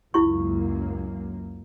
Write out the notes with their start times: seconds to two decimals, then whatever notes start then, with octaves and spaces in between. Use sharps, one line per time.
0.14 C#2 F#2 A#3 E4 F4 C#6